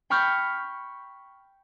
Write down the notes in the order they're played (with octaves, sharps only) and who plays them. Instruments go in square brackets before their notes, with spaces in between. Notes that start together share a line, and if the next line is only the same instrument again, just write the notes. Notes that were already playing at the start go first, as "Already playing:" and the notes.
[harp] G5 B5 C#6 F6 G6